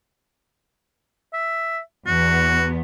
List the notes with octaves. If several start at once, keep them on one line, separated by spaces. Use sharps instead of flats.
E5
E2 B3 F#4